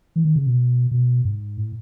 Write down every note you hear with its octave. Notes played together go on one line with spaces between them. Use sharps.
E3
D#3
C#3
B2
B2
G#2
A2